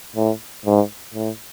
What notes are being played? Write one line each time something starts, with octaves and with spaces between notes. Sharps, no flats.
A2
G#2
A2